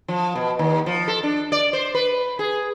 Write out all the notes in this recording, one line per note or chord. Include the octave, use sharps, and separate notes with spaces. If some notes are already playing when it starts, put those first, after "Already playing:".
F3
B2
D#2
F3
A4
D4
D5
C5
B4
G#4